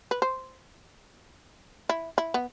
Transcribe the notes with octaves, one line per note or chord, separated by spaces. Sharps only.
B4
C5
E4
E4
B3